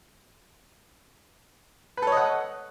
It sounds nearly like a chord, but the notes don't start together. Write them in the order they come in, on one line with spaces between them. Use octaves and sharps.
B4 A4 C#5 D#5 F#5